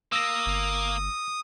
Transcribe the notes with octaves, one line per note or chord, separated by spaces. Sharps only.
A#3 D#6 E6 A#6
G1